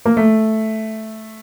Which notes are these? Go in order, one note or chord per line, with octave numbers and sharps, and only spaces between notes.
A#3
A3